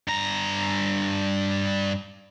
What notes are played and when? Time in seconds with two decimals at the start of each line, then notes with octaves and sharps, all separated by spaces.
0.08 G2 A#5